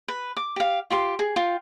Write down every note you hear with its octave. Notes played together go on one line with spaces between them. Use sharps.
B4
D6
G4 F5
F4 G4 C6
G#4
F4 G5